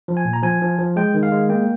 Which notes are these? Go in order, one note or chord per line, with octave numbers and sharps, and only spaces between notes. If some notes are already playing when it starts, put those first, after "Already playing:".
F3
G#5
A#2
A#5
F3 G#5
F3
F3
G#3 G5
D#3
F5
G#3
A#3 G5